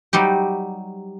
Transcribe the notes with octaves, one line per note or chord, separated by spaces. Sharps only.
F#3 G3 D#4 G4